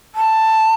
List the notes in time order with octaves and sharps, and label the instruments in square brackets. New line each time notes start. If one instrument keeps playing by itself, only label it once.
[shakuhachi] A5